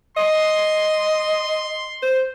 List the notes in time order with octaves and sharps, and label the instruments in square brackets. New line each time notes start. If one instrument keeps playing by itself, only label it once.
[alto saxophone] D#5 [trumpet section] C6
[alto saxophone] C5